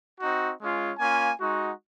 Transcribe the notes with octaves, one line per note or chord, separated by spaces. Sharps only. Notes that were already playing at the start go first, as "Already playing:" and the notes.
C4 D#4 F#4
G#3 C#4 F4
A#3 C#4 F4 G#5
G#3 D#4 F#4